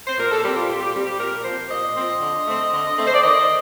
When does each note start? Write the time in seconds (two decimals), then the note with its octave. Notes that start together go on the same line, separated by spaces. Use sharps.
0.07 C5
0.17 A#2 A#4
0.30 A4
0.43 G3 C4 G4
0.55 F4
0.69 A#2 G4
0.81 G4
0.94 G3 C4 G4
1.06 G4
1.19 A#2 A#4
1.44 F3 C4 C5
1.70 A#2 D#5
1.95 F3 C4
2.21 D3
2.46 A3 C4
2.72 D3
2.97 A3 C4
3.07 C5
3.14 D5
3.22 D#3 D#5